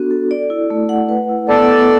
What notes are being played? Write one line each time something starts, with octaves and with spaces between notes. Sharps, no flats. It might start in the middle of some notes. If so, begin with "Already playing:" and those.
Already playing: B3 D4 F#4 A4
A4
D5
E4
A3
F#5
B4
E4
B3 A4 D5
B3